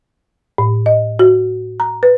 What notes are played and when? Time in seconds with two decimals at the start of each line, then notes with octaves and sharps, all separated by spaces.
0.58 A2
0.86 D#5
1.19 F#4
1.80 A#5
2.03 B4